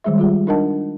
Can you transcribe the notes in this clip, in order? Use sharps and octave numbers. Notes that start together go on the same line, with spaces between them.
D#3 G3 G#3 G#4 E5
G3 F4 G4 G#4
D4 D#4 A#4 D#5 F#5 A5